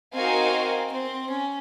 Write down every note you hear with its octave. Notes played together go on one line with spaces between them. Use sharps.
C4 D#4 F#4 A#4 F5 G#5
C4
C#4